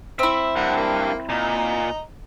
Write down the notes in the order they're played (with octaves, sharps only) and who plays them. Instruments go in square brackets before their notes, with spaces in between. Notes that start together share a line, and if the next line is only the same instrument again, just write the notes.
[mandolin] C4 E4 [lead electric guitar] E5
[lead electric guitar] G2 [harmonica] A#4 F#5
[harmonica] A#3
[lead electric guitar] A#2 [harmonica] D#5 A#5